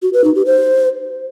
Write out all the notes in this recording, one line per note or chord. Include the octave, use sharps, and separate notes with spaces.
F#4
B4
D#4
G4
C5